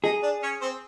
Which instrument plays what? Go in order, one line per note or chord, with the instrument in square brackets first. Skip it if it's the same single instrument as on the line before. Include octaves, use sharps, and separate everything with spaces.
[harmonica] D#4 D#5 [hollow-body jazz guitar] G#4
[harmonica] D4 D5
C#4 C#5
C4 C5